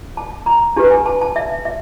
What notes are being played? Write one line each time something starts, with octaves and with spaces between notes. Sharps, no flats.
A5
A#5
D4 G4 B4 A5
G#5
A5
A5
E5
E5